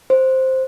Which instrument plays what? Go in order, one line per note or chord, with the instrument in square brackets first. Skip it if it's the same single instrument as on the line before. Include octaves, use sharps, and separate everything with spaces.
[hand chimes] C5